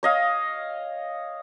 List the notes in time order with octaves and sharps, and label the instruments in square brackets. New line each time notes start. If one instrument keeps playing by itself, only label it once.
[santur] C#5 D#5 F5